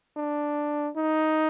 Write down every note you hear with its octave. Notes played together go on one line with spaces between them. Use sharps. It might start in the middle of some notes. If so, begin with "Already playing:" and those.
D4
D#4